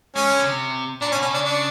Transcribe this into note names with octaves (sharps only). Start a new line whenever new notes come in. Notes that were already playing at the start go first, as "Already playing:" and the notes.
G#3 C#4
D3
C3
A#2 D4
C#4
B2
C#4
C#3 D4
D4